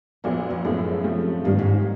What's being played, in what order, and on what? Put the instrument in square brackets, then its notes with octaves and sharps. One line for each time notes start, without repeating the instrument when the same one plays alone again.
[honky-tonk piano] A#1 A#2 F#3 B3 [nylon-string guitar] F2
[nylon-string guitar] F2
[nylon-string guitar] F#2 [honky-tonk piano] A2 F3 G#3 B3 E4
[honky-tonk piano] C3 F3 A3 C4
[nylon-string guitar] G2 [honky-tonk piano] D#3 G3 A#3
[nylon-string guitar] G#2